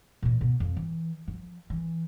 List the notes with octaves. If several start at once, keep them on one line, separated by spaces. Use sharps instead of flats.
A#2 E3
B2
F2
E3
F3
E3